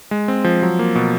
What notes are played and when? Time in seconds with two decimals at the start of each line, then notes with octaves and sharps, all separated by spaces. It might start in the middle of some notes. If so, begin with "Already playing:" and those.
0.11 G#3
0.28 C4
0.44 F3
0.62 F#3
0.79 A#3
0.95 B2